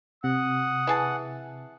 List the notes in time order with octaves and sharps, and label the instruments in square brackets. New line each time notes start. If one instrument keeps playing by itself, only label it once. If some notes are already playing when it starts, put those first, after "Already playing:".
[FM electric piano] C3 [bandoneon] F#5 [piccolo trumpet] D#6
[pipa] E3 G#4 A5